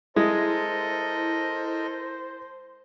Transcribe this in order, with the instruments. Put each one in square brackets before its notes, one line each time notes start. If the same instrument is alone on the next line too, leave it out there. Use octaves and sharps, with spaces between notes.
[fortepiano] G#3 [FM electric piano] E4 [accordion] A4 A#4 D#5 [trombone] C5